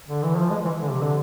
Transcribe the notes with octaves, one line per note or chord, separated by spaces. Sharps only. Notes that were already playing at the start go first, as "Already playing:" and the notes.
D3
E3
F3
G#3
E3
D3
C3
D3